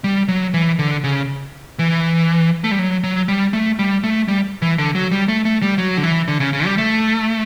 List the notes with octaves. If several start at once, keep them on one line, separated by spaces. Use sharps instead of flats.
G3
F#3
E3
D3
C#3
E3
A3
G3
F#3
F#3
G3
A3
G3
A3
G3
E3
D3
F#3
G3
A3
A3
G3
F#3
D3
E3
D3
C#3
C#3
G3
A3